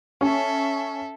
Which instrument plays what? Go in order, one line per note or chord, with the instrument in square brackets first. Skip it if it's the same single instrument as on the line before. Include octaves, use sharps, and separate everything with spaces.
[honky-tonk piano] C#4 [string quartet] A4 E5